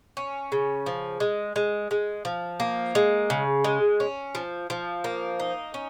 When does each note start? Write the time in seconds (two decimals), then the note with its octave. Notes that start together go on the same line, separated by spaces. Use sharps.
0.17 C#4
0.52 C#3
0.86 F3
1.20 G#3
1.56 G#3
1.91 G#3
2.25 F3
2.60 A#3
2.95 G#3
3.30 C#3
3.64 G#3
4.00 C#4
4.35 F3
4.70 F3
5.04 A#3
5.40 D#4
5.74 C#4